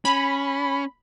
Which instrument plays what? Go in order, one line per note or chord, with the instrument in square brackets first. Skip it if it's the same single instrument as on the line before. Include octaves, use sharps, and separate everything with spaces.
[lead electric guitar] C#4 [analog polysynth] B5